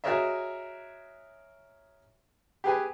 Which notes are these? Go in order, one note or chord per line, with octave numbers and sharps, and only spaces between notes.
F#4 G#4 A#4 C#5 D#5 E5
G4 G#4 B4 G#5